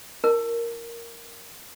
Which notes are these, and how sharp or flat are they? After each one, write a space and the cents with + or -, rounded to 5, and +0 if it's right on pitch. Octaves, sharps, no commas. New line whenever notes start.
E4 +0 A#4 +0 A5 +0